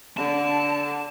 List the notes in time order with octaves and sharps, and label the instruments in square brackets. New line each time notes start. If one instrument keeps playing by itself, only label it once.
[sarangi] D3 [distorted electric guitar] A5